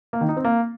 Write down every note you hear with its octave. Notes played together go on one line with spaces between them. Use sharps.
A#3
D#3
D#4
C4
A#3